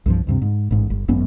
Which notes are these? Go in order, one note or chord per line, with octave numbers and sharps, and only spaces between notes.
C2 G2 F3
D2 G2 C3
G#2
A1 G#2
G1
G#1 F#2 B3 C#4